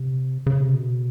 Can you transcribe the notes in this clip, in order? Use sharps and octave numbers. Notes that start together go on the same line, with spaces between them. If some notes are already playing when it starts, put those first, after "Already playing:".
Already playing: C3
C#3
C3
B2